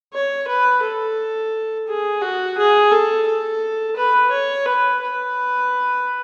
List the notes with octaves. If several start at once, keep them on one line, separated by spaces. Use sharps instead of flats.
C#5
B4
A4
G#4
F#4
G#4
A4
A4
B4
C#5
B4
B4